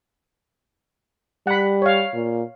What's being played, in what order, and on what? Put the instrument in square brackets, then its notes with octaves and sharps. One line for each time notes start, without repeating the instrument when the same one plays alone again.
[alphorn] G3 [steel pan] F#5 B5
[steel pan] C#5 F5
[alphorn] A#2